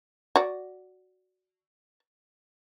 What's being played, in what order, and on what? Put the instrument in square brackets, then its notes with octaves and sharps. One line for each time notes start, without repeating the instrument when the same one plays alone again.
[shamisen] F#4 D5